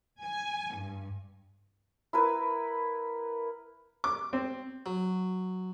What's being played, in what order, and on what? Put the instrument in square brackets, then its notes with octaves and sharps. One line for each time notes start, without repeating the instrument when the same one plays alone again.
[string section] G#5
G2
[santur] E4 A#4 B4
[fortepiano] D6
C4
[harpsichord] F#3